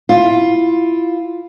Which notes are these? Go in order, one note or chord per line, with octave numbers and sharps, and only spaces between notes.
E4 F4